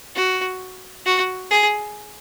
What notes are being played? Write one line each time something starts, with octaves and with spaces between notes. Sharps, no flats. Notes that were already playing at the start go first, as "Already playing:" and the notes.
F#4
F#4
G#4